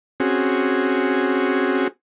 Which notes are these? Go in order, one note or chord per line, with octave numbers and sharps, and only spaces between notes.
C4 C#4 F#4 G#4